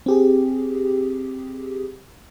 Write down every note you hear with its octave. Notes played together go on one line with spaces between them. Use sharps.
C4 G4 G#4